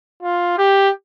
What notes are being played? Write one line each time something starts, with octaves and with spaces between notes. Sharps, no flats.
F4
G4